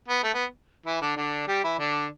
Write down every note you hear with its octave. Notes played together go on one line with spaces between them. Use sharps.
B3
A3
B3
E3 E4
D3 D4
D3 D4
G3 G4
E3 E4
D3 D4